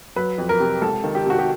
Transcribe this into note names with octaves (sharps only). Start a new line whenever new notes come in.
F#3 B4
F2
A#4
C3
C#2 A4
D#3
G4
C3 F#4
G4